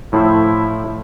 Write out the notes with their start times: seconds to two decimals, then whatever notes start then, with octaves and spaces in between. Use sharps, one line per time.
0.13 A2 F3 E4 C5